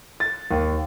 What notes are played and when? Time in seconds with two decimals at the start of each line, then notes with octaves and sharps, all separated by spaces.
0.20 A6
0.51 D#2